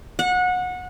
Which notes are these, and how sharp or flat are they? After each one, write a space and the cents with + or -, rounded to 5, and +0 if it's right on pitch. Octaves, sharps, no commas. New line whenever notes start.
F#5 -25